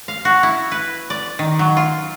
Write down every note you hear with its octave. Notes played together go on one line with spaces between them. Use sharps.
F5
F#4
E4
B4
D5
D#3
F#3
F4